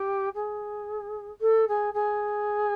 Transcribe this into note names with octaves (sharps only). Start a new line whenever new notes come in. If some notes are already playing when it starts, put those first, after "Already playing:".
Already playing: G4
G#4
A4
G#4
G#4